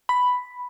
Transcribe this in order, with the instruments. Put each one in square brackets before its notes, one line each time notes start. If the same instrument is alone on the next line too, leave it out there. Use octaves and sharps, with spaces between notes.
[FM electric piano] B5